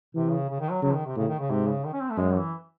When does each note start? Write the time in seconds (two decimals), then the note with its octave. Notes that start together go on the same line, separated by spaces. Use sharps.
0.15 C3 E3
0.32 C#3
0.49 C#3
0.60 D#3
0.71 F#3
0.82 C#3 F#3
0.94 D#3
1.06 C3
1.16 A2 C#3
1.28 D#3
1.39 C#3
1.50 G#2 C3
1.68 C#3
1.85 D#3
1.93 C#4
2.01 C4
2.10 A3
2.18 F#2 G#3
2.36 E3